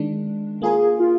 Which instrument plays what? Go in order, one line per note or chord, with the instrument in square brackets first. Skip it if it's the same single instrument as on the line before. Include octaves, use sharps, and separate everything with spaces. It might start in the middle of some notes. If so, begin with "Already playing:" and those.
Already playing: [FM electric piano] D#3 G#3 D4
[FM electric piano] A#3 F4 A#4 [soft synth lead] G#4
[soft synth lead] F4